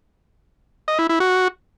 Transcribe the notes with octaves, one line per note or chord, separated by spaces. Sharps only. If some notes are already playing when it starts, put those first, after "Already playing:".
D#5
E4
E4
F#4